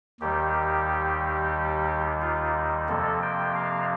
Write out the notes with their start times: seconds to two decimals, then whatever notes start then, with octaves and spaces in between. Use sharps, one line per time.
0.20 D#2 D#3 G3 G4
2.21 F4
2.88 F2 C3 F3 A#3 A4
3.22 G5
3.55 F5